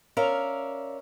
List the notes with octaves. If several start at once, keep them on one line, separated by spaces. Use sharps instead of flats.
C#4 A#4 D5 E5 F5